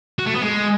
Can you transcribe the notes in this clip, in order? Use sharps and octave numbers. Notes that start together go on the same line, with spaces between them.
F#4
A3
B3
G#3